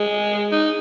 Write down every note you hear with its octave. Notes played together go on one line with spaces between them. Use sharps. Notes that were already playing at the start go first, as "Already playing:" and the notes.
Already playing: G#3
D#4